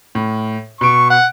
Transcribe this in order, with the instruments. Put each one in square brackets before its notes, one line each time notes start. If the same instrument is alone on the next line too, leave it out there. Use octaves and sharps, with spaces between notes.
[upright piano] A2
[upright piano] B2 D7 [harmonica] C#6
[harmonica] F#5